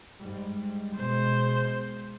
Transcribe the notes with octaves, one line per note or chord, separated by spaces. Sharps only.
G#2 G3
B2 G#3 C5